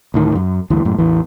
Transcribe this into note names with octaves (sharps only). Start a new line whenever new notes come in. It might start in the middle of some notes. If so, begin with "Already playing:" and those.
D2 A2 D#3
F#2
D2 G2 E3
F#2 A2
A1 E2 E3